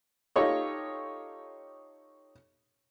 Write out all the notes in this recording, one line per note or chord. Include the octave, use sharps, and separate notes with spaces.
D#4 F4 G4 A4 C#5 D#5